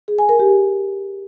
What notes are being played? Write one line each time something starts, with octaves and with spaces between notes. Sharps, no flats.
G#4
G#5
A#4
G4